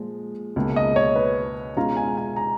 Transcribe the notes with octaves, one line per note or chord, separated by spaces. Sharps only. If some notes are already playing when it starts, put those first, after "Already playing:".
Already playing: A#2 F3 G#3
C#2 B2 A#3
D#5
C#5
B4
B2 G#3 C#4 F4 A#5
G#5
G#5
A#5